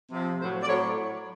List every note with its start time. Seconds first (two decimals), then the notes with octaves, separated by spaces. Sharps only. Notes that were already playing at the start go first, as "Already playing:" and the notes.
0.11 C3 F3
0.39 A2 F#3 C5
0.63 D5
0.67 A2 C#5
0.70 F#3